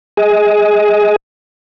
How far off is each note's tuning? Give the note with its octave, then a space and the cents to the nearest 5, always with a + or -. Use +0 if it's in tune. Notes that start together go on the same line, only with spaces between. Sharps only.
G#4 +0 D#5 +25